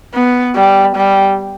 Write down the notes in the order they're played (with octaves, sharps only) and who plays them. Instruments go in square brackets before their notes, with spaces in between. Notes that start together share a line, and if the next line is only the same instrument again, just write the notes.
[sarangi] B3
G3
G3